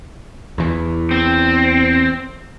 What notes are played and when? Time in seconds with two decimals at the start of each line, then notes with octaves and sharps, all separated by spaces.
0.58 E2 E3
1.11 C4